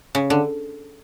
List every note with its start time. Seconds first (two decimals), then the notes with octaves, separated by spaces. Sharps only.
0.15 C#3
0.30 D3